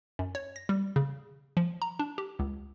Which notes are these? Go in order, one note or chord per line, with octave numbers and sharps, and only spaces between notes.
F#2
C#5
A#6
G3
C#3
F3
A#5
D4
G4
C#2